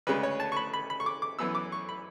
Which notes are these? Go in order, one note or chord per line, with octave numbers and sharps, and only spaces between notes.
D2 C#3 G#3 B4
C#5
A5
C#6
B5
B5
B5
C#6
D6
D6
F#2 E3 B3 E6
D6
C#6
B5